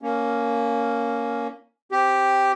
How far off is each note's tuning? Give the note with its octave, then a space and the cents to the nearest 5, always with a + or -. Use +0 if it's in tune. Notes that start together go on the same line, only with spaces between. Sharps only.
A#3 +0 C#4 +10
C4 +0 G4 +0